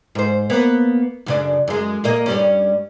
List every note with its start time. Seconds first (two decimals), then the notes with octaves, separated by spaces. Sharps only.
0.15 G#2 C5
0.50 A#3 B3
1.26 F#2 C#3 D4
1.68 F#2 G#3
2.04 A#2 A#3 D#5
2.26 G2 G3 C#4